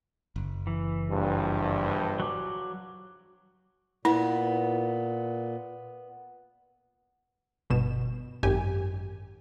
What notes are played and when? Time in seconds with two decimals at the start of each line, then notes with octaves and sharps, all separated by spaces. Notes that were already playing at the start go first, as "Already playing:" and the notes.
0.36 F#1
0.67 E3
1.09 A#1 G2
2.20 F#3 D6
4.05 A#2 B3 E4
7.70 G1 B2 E7
8.43 G#1 F#2 G4 G#5